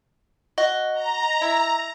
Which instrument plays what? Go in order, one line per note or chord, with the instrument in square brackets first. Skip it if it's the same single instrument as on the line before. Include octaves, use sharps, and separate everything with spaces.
[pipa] F#4 [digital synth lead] D#5
[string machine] A#5
[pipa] E4